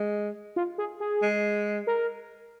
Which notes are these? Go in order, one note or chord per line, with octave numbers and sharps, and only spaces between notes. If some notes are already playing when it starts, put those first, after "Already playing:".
Already playing: G#3
F4
G#4
G#4
G#3
A#4